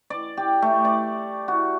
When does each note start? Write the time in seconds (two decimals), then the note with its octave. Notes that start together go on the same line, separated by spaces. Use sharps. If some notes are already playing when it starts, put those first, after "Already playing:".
0.10 D5
0.37 G4
0.62 A3
0.85 D5
1.48 F#4